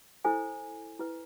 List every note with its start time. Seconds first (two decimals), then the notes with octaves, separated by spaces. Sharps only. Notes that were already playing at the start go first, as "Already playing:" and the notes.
0.25 E4 A4 C5 G#5
1.00 E4 B4